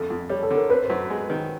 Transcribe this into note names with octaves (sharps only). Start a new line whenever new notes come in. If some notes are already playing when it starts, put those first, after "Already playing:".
Already playing: F2 D3 A4
F2
G3 C#5
A4
D3
A#4
C4 B4
C5
F#2
G#3
D#3